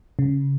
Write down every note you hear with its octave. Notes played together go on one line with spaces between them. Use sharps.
C#3